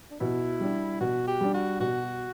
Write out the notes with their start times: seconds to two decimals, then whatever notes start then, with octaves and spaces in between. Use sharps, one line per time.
0.11 D4
0.20 B2 E4
0.60 G3 D4
1.01 B2 F#4
1.28 G4
1.41 G3 D4
1.54 F#4
1.80 B2 F#4